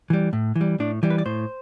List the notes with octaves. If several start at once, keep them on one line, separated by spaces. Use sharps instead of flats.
E3 G3
A2
E3
G3
A2 D4
E3 G3
B4
D5
A2 C5